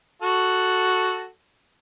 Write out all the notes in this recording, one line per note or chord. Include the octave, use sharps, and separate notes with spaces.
F#4 A4